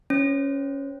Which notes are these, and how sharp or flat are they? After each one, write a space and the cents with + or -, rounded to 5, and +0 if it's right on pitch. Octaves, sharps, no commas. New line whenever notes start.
C#4 +0 C5 -30